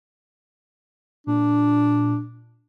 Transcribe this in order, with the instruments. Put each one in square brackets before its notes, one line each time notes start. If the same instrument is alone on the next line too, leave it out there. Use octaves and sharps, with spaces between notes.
[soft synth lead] A#2 [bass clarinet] D4